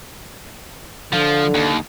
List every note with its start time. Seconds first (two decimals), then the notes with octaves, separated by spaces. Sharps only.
1.13 D3 F3
1.54 D#2